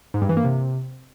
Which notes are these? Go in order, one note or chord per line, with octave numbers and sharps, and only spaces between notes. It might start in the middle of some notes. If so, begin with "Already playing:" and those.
G#2
G2
E3
A#3
C3